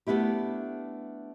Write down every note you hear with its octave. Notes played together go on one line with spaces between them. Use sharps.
A3 B3 D4 E4 G4